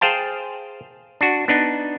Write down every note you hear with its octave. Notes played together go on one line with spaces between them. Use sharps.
G#4 C5 F5 G5 A5
D4 F#4
B3 D4 D#4